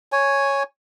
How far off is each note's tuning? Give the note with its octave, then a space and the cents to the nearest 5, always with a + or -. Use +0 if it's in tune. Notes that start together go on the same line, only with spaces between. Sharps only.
C#5 +0 G#5 +0